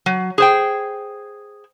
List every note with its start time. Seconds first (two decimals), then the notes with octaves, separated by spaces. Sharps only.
0.06 F#3
0.38 G#4 C5 G5